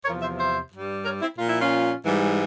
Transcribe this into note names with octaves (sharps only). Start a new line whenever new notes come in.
E2 C3 F3 A#4 C#5
C5 E5
C5 E5
G2 G3
A#4 C#5
C4 E4
A#2 F4
F3
E4
C#4 F4
G#2 E3 G3